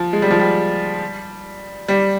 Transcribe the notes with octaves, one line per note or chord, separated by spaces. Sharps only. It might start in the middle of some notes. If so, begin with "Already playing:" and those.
Already playing: F3
G#3
G3
F3
G3
G3